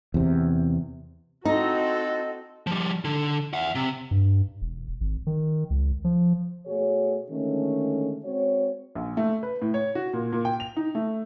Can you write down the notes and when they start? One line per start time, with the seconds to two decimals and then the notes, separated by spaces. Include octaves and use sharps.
0.14 E2 C3
1.45 C4 D#4 F#4 A4 D#5
2.67 F3 G3
3.05 D3
3.54 E5 F#5
3.75 C3
4.11 G2
4.62 E1
5.01 G#1
5.27 D#3
5.70 C#2
6.04 F3
6.66 B2 A3 F#4 G#4 C#5
7.30 D3 D#3 G#3 A3 C#4
8.25 G#3 C4 F#4 C#5
8.95 A#1
9.17 A3
9.43 B4
9.62 A2
9.74 C#5
9.95 F#4
10.13 A#2
10.33 A#2
10.45 G5
10.60 F7
10.77 D#4
10.95 A3